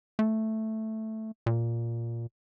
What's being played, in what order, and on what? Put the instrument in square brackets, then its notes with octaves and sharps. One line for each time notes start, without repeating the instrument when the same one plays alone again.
[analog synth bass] A3
A#2